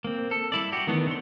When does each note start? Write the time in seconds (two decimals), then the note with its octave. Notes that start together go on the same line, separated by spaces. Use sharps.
0.04 A#3 C4
0.31 A4
0.52 G3 E4 D5
0.72 F#4 G4
0.87 D#3 E3 A3 B3 D4
1.07 D3 C4 C#5 C6